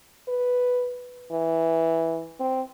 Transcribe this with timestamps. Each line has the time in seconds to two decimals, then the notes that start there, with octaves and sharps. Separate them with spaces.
0.28 B4
1.32 E3
2.40 C4